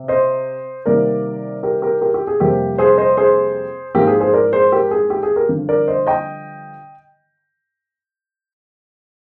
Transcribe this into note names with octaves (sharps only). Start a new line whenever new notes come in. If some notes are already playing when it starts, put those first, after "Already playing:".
Already playing: C3
C5 D#5
C3 D#3 G3 A#3 A#4 D5
G4 A#4
G4 A#4
G4 A#4
G4
G#4
F2 C3 G3 A#3 G4 A#4
G#4 C5
C5 D#5
G#4 C5
G#2 F3 A#3 G4 A#4
G#4
G#4 C5
A#4 D5
G#4 C5
G4 A#4
G#4
G4
G#4
G4 A#4
G2 D3 F3
A#4 D5
C5 D#5
D#5 G5